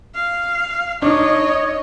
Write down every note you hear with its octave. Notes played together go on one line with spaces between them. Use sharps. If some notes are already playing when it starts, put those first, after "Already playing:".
F5
D4 D#4 C#5 D#5